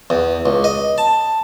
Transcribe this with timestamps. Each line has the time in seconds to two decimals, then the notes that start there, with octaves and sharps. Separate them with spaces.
0.10 E2
0.46 C#2
0.64 D#5
0.98 A5